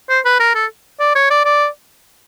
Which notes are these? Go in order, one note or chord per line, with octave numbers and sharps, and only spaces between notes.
C5
B4
A#4
A4
D5
C#5
D5
D5